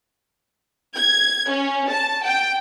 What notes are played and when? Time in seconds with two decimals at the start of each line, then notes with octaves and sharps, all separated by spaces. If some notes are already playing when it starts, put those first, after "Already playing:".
0.96 G#6
1.49 C#4
1.90 A5
2.25 G5